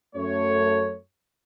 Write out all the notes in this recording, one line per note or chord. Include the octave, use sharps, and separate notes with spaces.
F#2 A3 C#5